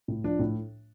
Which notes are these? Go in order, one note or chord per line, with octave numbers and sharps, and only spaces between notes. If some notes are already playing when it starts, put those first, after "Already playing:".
A2
F3 D4
A2